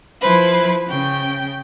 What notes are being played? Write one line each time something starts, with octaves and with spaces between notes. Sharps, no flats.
F3 E4 B4 C5
C#3 G5 G6